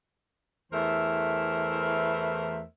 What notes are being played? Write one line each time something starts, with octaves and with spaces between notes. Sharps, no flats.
E2 E3 A3 A#4 C5 E5